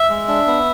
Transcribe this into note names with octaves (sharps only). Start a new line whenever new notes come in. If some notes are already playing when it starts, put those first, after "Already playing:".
Already playing: E5
G#3
D4
B3